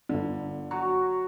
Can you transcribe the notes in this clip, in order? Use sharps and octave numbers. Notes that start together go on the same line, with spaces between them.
G1 D3
F#3 F#4 A#5